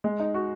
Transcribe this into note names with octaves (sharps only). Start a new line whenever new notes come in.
G#3
D#4
F#4